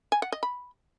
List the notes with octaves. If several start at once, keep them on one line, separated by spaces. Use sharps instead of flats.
G#5
F#5
D#5
B5